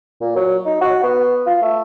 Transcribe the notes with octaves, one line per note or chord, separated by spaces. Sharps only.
A#2
F#3
D#4
F#4
B3
F4
A3